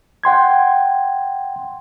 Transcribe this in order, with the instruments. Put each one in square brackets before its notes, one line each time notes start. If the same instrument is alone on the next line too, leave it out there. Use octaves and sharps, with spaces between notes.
[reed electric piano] F#5 G5 C6 G#6